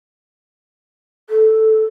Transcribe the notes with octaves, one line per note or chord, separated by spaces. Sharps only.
A4